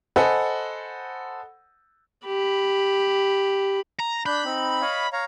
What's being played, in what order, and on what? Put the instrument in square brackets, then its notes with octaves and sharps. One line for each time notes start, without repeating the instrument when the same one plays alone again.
[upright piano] A4 C5 D#5 F#5 G#5 B5
[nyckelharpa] G4 B5
[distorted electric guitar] A#5
[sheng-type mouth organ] D4 F#6 G6 [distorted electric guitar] B5
[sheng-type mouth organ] C4 D#4
C#5 D#5 F5
C#5 F5 A#5